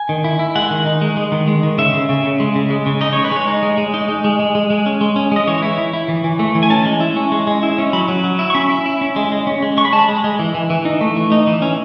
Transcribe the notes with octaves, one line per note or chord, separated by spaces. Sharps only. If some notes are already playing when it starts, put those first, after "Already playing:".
Already playing: G#5
D#3
E4
E4
G#3 F#5
D#3
D#4
G#3
G#3
D#3
G#3
D#3
C#3 E5
C#3
C#3
C#3
G#3
C#3
G#3
C#3
D#4 D#5
G#3 C#5
B4
G#3 C#5
D#4
G#3
G#3
D#4
G#3
G#3
G#3
G#3
G#3
C#4
G#3
C#4
G#3 D#5
E3 C#5
E4
E4
E4
E3
E3
A3
E3
G#5
C#4 A5
G#3
E4
C#4
G#3
G#3
E4
C#4
F#3 B5
F#3
F#3
E4
C#6
C#4 B5
E4
E4
C#4
G#3
G#3
C#4
G#3
G#3 C#6
B5
G#3 A5
B5
G#3
G#3
E3
E3
E3
D#4
A3
E3
D#4
E3
C#4